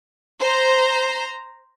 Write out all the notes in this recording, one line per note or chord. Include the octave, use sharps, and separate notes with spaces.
C5 A#5